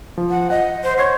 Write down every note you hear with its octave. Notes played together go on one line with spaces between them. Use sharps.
F3
F#5
D#5 F#5
C5
C#5 C6 G#6 C7